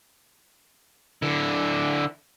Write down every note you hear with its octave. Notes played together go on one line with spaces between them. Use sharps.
D3 E4